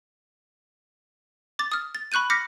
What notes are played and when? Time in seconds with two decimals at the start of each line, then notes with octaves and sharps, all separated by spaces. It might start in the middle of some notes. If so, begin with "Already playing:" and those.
1.59 D6 A6
1.72 D#6 F6
1.95 A6
2.12 B5 C#6 F#6 G6 D#7
2.30 D6 F6 G6 A#6 B6 C#7